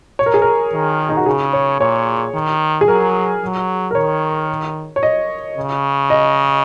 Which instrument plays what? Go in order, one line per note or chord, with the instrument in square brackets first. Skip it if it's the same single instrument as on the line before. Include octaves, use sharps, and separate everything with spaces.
[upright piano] C#5
A#4
G#4
A#4
[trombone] D#3
[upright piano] D#4
F#4
[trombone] C#3 [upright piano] G#4
[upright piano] C#5
[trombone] A#2 [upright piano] C#5
[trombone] D#3
[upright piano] G#4
[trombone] F#3 [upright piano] A#4
[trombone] F#3
[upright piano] A#4
[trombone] D#3 [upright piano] C#5
[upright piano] C#5
D#5
[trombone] C#3
[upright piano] D#5